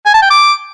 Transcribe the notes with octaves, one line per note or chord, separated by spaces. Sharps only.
G#5
A5
G5
D6